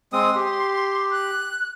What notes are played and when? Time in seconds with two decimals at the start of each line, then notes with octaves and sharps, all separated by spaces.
0.13 G#3 C4 C6 D#6
0.35 G4
1.11 F#6